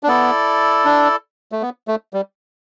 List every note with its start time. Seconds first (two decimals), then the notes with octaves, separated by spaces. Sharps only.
0.03 D4
0.08 B3 E4 A4 D5
0.85 D4
1.52 A3
1.62 B3
1.88 A3
2.14 G3